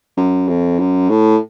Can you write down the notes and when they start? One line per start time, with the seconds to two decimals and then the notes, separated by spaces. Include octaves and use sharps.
0.17 F#2
0.48 F2
0.79 F#2
1.10 A2